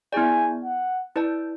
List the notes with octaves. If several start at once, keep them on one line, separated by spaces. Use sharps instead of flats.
B3 E4 G#4 D5 G#5
F#5
E4 B4 D5 A5